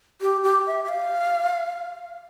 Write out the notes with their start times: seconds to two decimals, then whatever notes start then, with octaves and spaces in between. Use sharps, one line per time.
0.21 G4
0.43 G4
0.67 E5
0.84 E5
0.89 F5